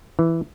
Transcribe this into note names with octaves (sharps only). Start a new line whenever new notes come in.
E3